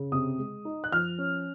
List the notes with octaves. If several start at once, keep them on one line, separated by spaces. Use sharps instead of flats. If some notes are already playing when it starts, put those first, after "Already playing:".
Already playing: C#3
C3 D#6
G#3
D#4
F#6
F3 F6
C#4